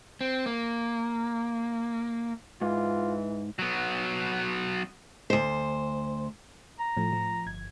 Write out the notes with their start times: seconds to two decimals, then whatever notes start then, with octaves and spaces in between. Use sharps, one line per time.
0.21 C4
0.46 A#3
2.61 G#2 E3 F4
3.59 F#3 B3
5.30 D2 C5
6.79 A#5
6.97 A2 F3 A3
7.13 F3
7.46 G1 G#6